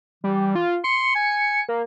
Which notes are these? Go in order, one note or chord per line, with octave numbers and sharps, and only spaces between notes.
E3 G3
F4
C6 C#7
G#5
A#3